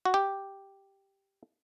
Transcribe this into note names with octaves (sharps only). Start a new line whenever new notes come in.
F#4
G4